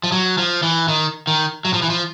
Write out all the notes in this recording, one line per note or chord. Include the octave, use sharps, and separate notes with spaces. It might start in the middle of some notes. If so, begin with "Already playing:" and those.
F3
F#3
F3
E3
D#3
D#3
F#3
F3
E3
F3